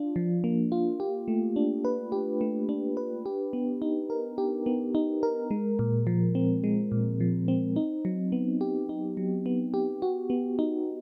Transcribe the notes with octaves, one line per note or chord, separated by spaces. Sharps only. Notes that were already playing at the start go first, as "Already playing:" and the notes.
Already playing: D4 F4
F3
A#3
F4
G4
A3
D4
B4
G4
A3
D4
B4
G4
B3
D#4
A#4
G4
B3
D#4
A#4
G#3
A#2
F3
C4
G#3
A#2
F3
C4
D#4
F#3
B3
G4
D#4
F#3
B3
G4
F#4
B3
D#4